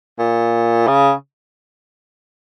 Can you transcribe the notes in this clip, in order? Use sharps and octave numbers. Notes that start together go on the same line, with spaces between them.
A#2
C#3